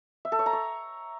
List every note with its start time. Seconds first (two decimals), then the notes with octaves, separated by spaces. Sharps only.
0.25 E5
0.32 A4
0.39 C#5
0.46 A#5
0.53 C#5